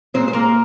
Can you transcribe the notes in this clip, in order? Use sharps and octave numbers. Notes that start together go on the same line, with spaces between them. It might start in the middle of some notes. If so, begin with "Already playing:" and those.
A#2 G#3 C4 C5
C5
A#3 A#4